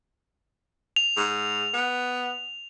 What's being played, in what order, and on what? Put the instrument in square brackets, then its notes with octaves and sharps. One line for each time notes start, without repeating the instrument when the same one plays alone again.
[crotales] F7
[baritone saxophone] G#2
B3